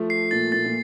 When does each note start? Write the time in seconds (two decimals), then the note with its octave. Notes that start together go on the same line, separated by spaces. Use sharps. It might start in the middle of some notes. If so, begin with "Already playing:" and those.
Already playing: F3 A3
0.10 C7
0.31 A#2 A6
0.52 A#2 A6
0.65 A#2